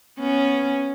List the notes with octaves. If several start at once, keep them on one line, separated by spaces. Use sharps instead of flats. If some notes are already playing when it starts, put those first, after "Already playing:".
B3 C#4